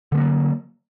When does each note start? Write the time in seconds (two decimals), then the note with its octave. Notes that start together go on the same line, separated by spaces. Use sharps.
0.12 D3
0.15 A3
0.17 A#3
0.20 F#3